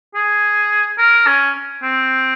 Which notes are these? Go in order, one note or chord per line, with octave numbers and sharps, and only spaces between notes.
G#4
A#4
C#4
C4